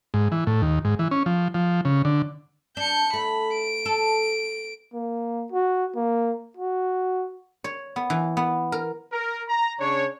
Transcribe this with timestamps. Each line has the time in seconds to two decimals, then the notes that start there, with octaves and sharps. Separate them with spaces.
0.14 G#2
0.32 E3
0.47 A2
0.62 D#2
0.85 G#2
0.99 E3
1.11 C#4
1.26 F3
1.54 F3
1.85 C#3
2.05 D3
2.77 D4 G6 C#7
3.13 A3 B5
3.53 D7
3.86 A4
4.94 A#3
5.52 F#4
5.95 A#3
6.57 F#4
7.64 C#5
7.96 B3
8.10 E3
8.37 B3
8.72 A#4
9.12 A#4
9.49 A#5
9.80 C#3 D4 C#5